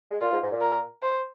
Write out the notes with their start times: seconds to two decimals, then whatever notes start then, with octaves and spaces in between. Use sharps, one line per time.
0.11 G#3
0.21 A#2 F4
0.31 G#2
0.42 G#2
0.52 A#2
0.62 A#4
1.02 C5